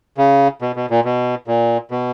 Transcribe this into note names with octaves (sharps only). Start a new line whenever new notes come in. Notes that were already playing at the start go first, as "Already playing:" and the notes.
C#3
B2
B2
A#2
B2
A#2
B2